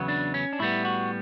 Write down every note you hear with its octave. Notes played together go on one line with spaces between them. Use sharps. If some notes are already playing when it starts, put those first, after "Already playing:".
Already playing: E2 C#3 F#3 B3
D4
C#4
D4
A2 G3 B3 E4
F#4